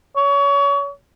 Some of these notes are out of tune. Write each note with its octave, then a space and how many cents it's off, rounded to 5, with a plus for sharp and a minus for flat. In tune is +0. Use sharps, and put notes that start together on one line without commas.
C#5 +30